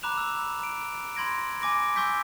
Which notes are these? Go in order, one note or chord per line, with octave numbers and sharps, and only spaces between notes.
A#5 B5 D6 F#6 E7 F7
E6
D7
B5 C6 G#6 A#6 D7
G#5 D6 A#6 D7
G#5 C#6 E6 G6 B6